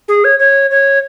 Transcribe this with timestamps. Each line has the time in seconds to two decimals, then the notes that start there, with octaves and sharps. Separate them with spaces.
0.08 G#4
0.24 C#5
0.39 C#5
0.71 C#5